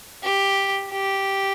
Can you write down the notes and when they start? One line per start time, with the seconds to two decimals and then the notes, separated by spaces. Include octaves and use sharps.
0.23 G4
0.91 G4